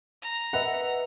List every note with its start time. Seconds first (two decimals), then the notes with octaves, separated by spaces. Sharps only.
0.22 A#5
0.53 B4 D#5 E5 F#5